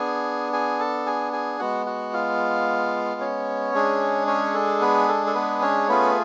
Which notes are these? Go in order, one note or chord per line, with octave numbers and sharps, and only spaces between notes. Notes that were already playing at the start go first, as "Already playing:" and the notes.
Already playing: B3 D4 G#4 G#5
G#4 G#5
A4 A5
G#4 G#5
G#4 G#5
G#3 B3 F#4 F#5
F#4 F#5
F4 F5
C#4 C#5
G#3 D4 G#4
C#4 C#5
A4
B3 B4
A4
A4
B3 B4
C#4 C#5
A3 B3 C#4 F4 G#4 B4